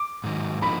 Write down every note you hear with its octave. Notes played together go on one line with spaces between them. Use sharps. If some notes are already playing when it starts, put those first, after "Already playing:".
Already playing: D6
G#2 D#3 F#3
D3 F3 A#3 D#4 B5